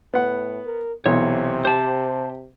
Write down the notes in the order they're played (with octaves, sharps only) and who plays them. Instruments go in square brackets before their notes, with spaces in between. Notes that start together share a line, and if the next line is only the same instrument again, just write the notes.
[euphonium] A2 [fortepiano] B3 F#5
[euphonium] A#4
[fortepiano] B1 E3 [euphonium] C3 [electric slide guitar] C#5
[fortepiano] G4 [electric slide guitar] C5 A5